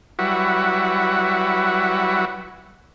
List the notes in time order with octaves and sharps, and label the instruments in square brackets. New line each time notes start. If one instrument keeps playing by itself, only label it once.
[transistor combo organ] F#3 G3 E4 F#4 B4